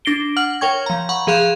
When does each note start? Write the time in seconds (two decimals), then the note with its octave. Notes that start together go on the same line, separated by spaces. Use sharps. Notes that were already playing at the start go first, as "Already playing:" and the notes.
0.05 D4 A#6 C7 D7 G7
0.37 F#5 F6 F#7
0.61 A#4 C#5 G5 C#6 G#6
0.86 F3 A#5
1.09 F#5 A#5 B5 C#6
1.27 F3 G#4 F5 C6 F#6 E7